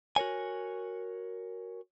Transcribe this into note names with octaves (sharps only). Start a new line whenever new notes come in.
F#4 A#4 C#5 G#5